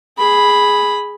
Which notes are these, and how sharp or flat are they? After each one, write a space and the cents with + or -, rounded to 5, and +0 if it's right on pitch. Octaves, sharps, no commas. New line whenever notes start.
G#4 +0 B5 +0